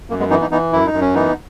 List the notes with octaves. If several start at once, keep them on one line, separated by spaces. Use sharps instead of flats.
F#2 A#3
G#3 B3
E3 B3 D#4
B3 D#4
E3 B3 D#4
F#2 E4
D#4
F#2
C#4
E3 B3 D#4